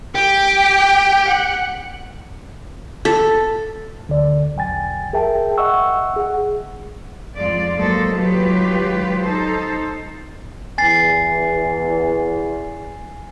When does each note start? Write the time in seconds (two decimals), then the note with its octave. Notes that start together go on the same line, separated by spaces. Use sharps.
0.15 G4 G5
1.28 F#5
3.05 A4
4.07 D2 D3 D5
4.56 B1 E2 G5 G#5 A6
5.13 G#4 A#4 E5 G5 A5
5.58 D#5 E5 F#5 C#6 E6
6.16 G#4 F#5
7.36 F2 G#2 G#3 F4 D5
7.77 G#2 F#3 A#3 A4 C5 D#5
8.17 D#3 F#3 G#3 F4 G4 B4
9.22 D#4 A4 C5
10.78 E2 G#5 A6 C7